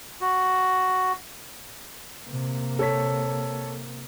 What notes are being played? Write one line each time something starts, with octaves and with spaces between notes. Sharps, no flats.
F#4
C3 A#3
A4 C#5 B6